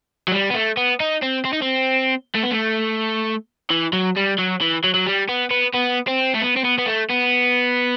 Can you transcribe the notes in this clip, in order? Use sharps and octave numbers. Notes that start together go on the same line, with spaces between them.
F#3
G3
B3
A3
B3
D#4
C4
C4
D#4
C4
A3
B3
A3
E3
F#3
G3
F#3
E3
F#3
F#3
G3
B3
B3
B3
C4
A3
B3
C4
B3
B3
A3
B3